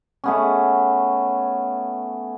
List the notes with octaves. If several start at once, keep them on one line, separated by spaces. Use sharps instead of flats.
A3 B3 C#4